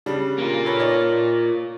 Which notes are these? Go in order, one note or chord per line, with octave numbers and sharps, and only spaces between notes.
C#3 G3 D4
A#3 F4
A4 B4 C#5
D#4 C#5 D5